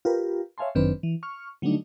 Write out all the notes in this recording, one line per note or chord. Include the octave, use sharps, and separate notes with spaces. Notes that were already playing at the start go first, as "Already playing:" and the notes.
F4 G4 A#4 B4
C#5 E5 F5 G#5 A5 C6
G1 F#2 D#3 C4 D4 B4
E3
C#6 F6
D3 F#3 G3 A3 D4 D#4